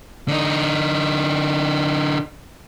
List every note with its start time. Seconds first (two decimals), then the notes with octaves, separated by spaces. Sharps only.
0.28 D3 D#4